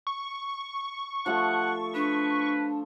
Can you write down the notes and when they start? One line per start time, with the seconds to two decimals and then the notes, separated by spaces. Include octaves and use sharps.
0.07 C#6
1.26 F3 A3 A4 F#5
1.95 D4 B4